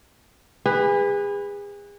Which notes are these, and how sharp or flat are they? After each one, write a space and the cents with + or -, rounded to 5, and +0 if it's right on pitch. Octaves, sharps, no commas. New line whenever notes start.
G#4 -35 B4 +0